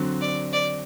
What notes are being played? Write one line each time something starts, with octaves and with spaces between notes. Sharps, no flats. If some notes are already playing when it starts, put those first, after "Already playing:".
Already playing: D3 F#3 C4
D5
D5